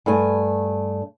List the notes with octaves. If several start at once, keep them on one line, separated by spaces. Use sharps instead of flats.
G2 A3 G#5